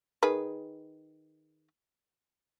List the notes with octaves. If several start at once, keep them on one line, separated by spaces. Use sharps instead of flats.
D#3 G#4 B4